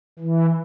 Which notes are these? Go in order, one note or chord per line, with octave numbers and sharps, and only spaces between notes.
E3